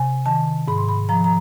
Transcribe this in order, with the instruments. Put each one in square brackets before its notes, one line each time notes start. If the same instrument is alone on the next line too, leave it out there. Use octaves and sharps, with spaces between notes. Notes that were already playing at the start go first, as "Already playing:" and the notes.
Already playing: [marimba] C3 G#5
D#3 A5
G#2 B5
C6
B5
F3 A#5
A#5